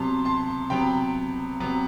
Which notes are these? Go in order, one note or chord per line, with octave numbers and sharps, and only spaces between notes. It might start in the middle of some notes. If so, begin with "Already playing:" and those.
Already playing: C3 F#3 B3 A5 C6
A5 C6
C3 F#3 B3 G5 B5
C3 F#3 B3